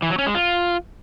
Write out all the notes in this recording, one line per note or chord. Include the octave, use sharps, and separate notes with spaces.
E3
F#3
C#4
G#3
F4